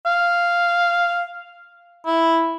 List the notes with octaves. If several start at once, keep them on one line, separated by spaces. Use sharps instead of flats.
F5
E4